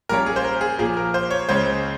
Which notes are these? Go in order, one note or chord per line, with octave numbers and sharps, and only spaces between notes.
A#2 G3 A#3 C#4 A#4
G#4
C5
A#4
G#4
A#2 F3 A#3 G#4
A#4
C5
C#5
C#2 C#3 G#3 C#4 C5